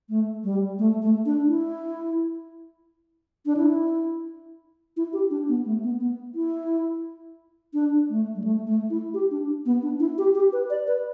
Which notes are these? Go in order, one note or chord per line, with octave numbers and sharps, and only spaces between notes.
A3
G3
A3
A3
D4
E4
D4
E4
E4
G4
D4
B3
A3
B3
B3
E4
D4
A3
G3
A3
A3
E4
G4
D4
B3
D4
E4
G4
G4
B4
D5
B4